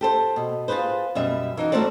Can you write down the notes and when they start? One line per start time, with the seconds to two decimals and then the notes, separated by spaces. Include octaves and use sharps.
0.01 G4 A4 C5
0.36 B2
0.68 F4 F#4 G#4 B4 C5
1.15 F#2 B2 G3 E5
1.57 E3 D#4 F#4
1.72 G2 A3 C4 F#4 C5 D5